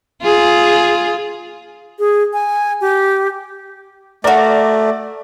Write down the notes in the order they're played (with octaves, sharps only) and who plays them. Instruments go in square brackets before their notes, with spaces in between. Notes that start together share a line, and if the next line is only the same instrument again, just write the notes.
[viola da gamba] F4 G#4
[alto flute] G#4
G#5
G4
[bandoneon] A3 [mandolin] F#4 A#4 [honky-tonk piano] D5